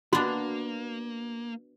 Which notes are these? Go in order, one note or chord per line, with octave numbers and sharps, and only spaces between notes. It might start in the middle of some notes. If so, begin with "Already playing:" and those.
A#3 B3 D4 F#4